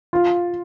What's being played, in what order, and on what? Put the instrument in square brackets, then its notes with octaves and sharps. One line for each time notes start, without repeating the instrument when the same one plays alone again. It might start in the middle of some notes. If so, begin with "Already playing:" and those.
[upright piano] F4